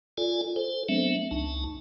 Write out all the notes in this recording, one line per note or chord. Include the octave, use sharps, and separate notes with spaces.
F4 A4 D5 G#5
A4 C5
F#3 A3 B3 C4 D4 E5
C#2 D#4 A5